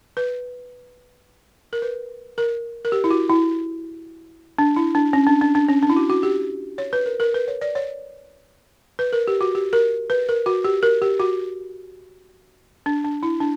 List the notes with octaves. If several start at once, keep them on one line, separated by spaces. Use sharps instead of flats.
B4
A#4
B4
A#4
A#4
G4
E4
F#4
E4
D4
E4
D4
C#4
D4
D4
D4
C#4
D4
E4
F#4
F#4
G4
C#5
B4
A#4
A#4
B4
C#5
D5
C#5
B4
A#4
G4
F#4
G4
A#4
B4
A#4
F#4
G4
A#4
G4
F#4
D4
D4
E4
D4